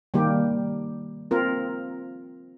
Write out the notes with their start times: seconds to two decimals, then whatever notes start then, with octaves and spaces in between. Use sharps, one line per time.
0.14 D#3 G3 A#3 G4
1.31 C4 F4 A#4